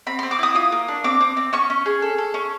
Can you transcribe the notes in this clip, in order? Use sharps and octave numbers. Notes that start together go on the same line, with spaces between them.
C4 B5
C6
C4
D6
E4 D#6
F4 D#6
A#3
D4
C4 D6
C4
C4
C#4 C#6
C#4
G#4
A4
A4
C#4